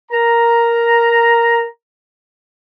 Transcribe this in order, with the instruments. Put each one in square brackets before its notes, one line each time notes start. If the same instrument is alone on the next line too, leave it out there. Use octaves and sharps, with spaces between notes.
[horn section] A#4 A#5